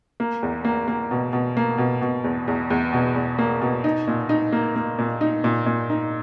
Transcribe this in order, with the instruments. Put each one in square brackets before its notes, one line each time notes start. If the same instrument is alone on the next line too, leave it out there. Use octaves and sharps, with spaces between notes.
[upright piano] A#3
E2
A#3
A#3
B2
B2
A#3
B2
B2
E2
E2
E2
B2
E2
A#3
B2
D#4
A#2
D#4
A#3
A#3
A#2
D#4
A#2
A#2
D#4